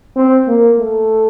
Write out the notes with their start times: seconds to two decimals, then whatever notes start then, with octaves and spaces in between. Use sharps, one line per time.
0.16 C4
0.48 A#3
0.79 A3